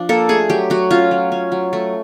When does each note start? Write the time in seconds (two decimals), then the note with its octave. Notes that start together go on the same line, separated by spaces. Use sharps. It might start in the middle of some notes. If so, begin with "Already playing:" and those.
Already playing: F3 D4
0.09 A#3 A4
0.29 A3 G#4
0.50 F#3 G4
0.70 F#3 F#4
0.91 C#4 F4
1.11 F#3
1.32 C#4
1.52 F#3
1.73 A3